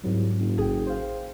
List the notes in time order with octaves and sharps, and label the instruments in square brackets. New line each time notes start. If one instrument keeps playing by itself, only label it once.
[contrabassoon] C2 [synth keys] G#2 F#3
[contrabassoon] F#1
[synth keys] A1 G5 [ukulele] G#4
[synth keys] C5 F5